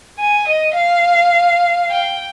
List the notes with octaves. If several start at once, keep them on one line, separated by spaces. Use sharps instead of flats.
G#5
D#5
F5
G5